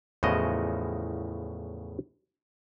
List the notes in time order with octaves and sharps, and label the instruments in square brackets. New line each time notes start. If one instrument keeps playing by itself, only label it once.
[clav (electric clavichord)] E2 A2 C#3 F3 F#4 D#5